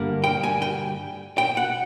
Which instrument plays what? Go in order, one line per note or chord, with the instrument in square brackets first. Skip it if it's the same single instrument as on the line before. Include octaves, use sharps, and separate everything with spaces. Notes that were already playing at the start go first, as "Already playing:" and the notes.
Already playing: [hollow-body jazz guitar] G2 D3 G3 A#3
G5
G#5
G5
G5
F#5